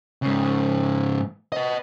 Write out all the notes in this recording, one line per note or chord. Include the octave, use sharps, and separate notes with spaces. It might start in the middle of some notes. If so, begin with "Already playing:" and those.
G#2 C#3
B4 D#5